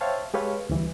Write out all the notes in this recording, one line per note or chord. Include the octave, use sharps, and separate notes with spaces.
C5 C#5 E5 F5 G5 A5
G#3 G4 A4 B4 C#5 F5
D2 E3 G3